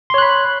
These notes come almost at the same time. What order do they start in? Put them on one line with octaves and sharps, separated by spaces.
C6 C#5 F#6 B5